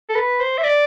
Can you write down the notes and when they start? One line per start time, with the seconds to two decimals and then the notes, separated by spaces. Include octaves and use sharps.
0.09 A4
0.15 B4
0.40 C5
0.58 E5
0.64 D5